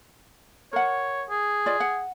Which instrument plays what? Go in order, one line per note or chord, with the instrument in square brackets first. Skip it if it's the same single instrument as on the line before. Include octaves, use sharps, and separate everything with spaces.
[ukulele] A#4 F#5 [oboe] C#5
[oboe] G#4
[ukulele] F4 D5 D#5
F#5